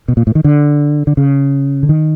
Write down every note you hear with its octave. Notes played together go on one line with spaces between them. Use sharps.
B2
A#2
A2
D#3
D3
D3
C#3
D3
D#3